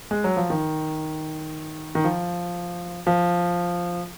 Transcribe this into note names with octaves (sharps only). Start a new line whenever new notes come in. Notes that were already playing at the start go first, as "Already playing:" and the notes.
G#3
F#3
F3
D#3
D#3
F3
F3